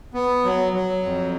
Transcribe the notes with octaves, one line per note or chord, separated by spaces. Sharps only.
B3
F#3
F#3
F2